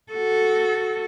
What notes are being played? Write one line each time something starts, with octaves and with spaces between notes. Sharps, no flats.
F#4 A4